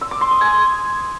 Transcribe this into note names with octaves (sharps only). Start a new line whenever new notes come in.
E6
D6
C6
D#6
G#5